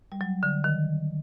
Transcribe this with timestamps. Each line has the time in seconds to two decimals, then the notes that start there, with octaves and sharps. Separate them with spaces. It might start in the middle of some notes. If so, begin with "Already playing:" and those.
0.12 G3
0.21 F#3
0.43 D3
0.64 D#3